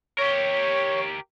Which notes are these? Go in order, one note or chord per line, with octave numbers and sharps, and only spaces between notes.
G4 A#4 C#5